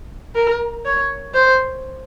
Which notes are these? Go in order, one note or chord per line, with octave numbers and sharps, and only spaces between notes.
A#4
C#5
C5